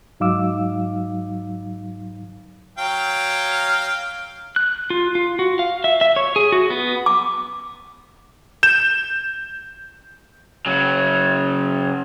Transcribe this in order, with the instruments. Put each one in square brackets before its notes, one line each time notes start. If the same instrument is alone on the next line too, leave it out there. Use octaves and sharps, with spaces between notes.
[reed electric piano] G#2 F#3 D#4 F5 D6 E6
[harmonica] F#3 F5 G5
[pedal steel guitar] F#6
F4
F4
F#4
F5
E5
E5
C#5
G#4
F#4
B3
[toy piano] D6
[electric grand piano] G6 E7
[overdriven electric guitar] C#3 F#3